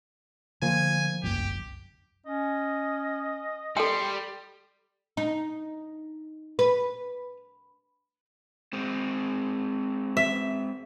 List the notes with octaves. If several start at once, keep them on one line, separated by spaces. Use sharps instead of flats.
D3 F3 A#3 G#5
G1 C2 F#2 G4
C#4 D#5
G3 A4 G5 C6
D#4
B4
G#3 C4
E5